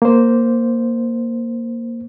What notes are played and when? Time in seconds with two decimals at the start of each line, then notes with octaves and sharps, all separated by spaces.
0.02 A#3 C5